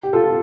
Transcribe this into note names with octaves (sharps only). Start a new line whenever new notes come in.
G4
F4 A4